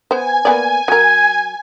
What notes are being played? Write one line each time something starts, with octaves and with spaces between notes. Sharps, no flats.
B3 C5 G#5
A#3 B3 D5
F#3 A#4 G#6